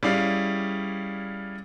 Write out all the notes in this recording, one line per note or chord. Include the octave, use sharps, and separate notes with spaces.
G3 C#4 E4 G#4 D5 F5